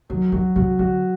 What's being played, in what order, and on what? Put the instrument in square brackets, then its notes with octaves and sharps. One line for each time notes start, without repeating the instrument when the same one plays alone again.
[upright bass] D#3 [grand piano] F#3
[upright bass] D#3 [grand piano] F#4
[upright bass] C#3 [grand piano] F#4
[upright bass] D3 [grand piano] F#4